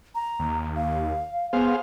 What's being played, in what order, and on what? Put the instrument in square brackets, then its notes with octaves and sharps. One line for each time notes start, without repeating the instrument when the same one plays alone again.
[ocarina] A#5
[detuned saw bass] D#2
[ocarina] F5
[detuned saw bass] B3 [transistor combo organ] G#4 C5 F5